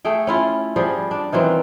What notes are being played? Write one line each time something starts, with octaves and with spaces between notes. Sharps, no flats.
A3 G#4 G5
C#4 E4 F4
F3 G3 G#4
D4
D#3 E3 F#3 C4